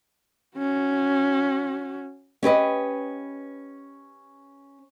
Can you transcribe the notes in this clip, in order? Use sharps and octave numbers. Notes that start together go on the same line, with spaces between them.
C#4 F#4
C#4 G4 B4 D#5